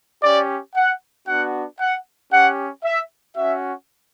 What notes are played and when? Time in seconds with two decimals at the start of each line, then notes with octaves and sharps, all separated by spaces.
0.23 C#4 G4 D5
0.75 F#5
1.28 B3 D4 F#4 F#5
1.80 F#5
2.32 C#4 G4 F#5
2.84 E5
3.37 C#4 F#4 E5